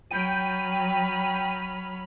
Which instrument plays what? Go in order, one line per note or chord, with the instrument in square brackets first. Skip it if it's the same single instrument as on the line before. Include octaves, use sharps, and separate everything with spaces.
[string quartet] F#3 B5 F6 [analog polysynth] G5 D#7